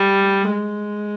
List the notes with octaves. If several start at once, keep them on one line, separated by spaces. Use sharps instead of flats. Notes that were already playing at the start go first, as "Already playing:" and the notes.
Already playing: G3
G#3